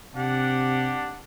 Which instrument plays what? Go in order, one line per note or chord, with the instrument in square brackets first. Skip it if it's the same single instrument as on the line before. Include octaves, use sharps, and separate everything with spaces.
[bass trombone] C3 [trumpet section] D4 G4 F#5